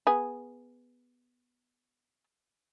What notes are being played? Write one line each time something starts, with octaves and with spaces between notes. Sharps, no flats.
B3 G#4